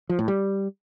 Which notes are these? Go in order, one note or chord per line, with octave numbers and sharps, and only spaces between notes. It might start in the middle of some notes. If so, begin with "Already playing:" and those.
F3
A2
G3